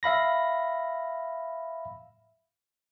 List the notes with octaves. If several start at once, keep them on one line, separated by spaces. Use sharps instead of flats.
E5 F5 B5 A#6